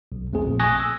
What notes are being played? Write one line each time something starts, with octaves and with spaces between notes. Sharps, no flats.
B1
F2 A3 C4 G#4
A#1 A#2
G#5 C#6 D#6 F#6 G#6 A#6
E6